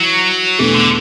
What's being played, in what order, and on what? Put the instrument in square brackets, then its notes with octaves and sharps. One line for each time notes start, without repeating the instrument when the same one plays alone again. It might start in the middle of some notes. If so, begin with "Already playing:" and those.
Already playing: [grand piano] E3 [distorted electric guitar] F#3
[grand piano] E2 B2 A3 D4 A4 [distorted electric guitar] E3
[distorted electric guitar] D3